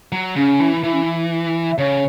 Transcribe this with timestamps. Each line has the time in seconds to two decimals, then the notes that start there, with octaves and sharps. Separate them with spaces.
0.12 F#3
0.36 C#3 C#4
0.60 E3
0.83 E3 E4
0.93 C#4
1.03 E4
1.70 E5
1.78 C#3 C#5